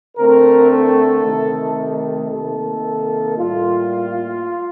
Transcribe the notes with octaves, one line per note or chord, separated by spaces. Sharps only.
D3 A3 C4 A#4
A4
C3 D#3 A3
C3 D#3 A#3 A4
A2 G3 A#3 F4